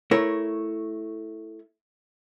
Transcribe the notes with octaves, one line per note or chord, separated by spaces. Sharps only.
A3 E4 A#4 C#5